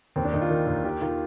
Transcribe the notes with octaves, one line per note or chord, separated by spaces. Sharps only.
D#2 C4
D4
D#2 D#4
F4
D#3
D#2
D#3 G4
D#3 F4